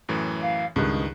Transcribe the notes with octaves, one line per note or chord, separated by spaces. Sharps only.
F#2 A2 E3
F5
C#2 G2 D#3 G#4 F#6